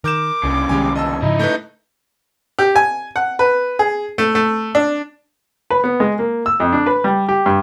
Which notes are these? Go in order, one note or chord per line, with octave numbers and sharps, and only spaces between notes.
D#3 A#4 D6 G6 E7
C2 G2 C#3
C2 D#3 G#3 C#4 G4 G#5
D#5 A5 E6
G#2 C#3 F3 D#4 E4
A3 B4 G6
G4
G#5
F#5
B4
G#4
A3
A3
D4
B4
B3
G#3
A#3
E6
F2
D4
B4
G3
G4
G2